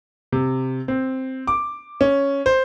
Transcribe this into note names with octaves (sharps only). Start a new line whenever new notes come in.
C3
C4
D6
C#4
C5